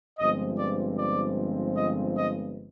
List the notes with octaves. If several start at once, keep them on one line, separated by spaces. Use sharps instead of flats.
G1 G2 F3 G#3 C4 D#5
D5
D5
D#5
D#5